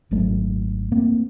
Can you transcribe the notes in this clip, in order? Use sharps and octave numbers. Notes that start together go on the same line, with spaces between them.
G#1 F#3 A3
A3 A#3 C4